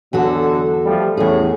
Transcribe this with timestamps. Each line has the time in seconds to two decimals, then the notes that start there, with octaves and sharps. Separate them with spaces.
0.13 E2 B2 D3 F#3 F#4 A4
0.85 F3 G3 A3
1.17 E2 A2 G3 C#4 G#4